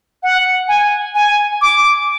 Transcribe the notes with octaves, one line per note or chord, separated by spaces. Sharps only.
F#5
G#5
G#5
D6